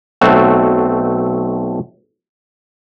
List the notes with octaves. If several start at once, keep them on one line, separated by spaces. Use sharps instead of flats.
B1 A3 C4 F#4